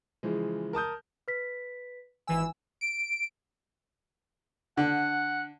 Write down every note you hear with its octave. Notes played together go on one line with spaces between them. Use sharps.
C#3 E3 F3 G#3
A#4 A5 D#6 G6
B4 B6
G#1 E3 G#5 E6
D7
D3 F#5